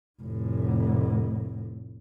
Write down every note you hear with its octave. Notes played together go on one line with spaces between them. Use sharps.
F1 A2